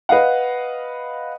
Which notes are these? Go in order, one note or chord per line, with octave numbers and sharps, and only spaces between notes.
B4 D#5 F5 F#5